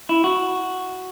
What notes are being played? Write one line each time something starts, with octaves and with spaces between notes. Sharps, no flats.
E4
F#4